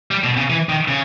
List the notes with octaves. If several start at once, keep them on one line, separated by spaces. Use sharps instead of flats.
G3
B2
C#3
E3
D#3
C#3